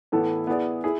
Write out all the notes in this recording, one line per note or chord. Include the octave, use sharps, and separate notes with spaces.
A2 E3 B3 E4 A4
B3 E4 G#4 D5
E4 G#4